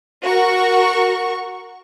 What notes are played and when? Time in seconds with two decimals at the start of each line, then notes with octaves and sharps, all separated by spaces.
0.25 F#4 A#4 C#6